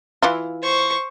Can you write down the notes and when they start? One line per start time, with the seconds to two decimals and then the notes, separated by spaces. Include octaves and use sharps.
0.22 E3 E4 F4
0.63 C5 C#6